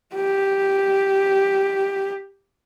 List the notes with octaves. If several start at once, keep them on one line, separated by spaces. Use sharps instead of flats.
G4